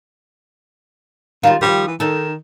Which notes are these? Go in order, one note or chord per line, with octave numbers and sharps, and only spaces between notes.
D#3 G3 F4
D#3 F3 G3
E3
D#3 D#4 A4